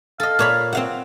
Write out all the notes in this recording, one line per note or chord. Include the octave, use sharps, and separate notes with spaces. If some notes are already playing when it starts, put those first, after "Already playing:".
A4 D#5 F5
A#2 C#5 B5
C4 F5 F#5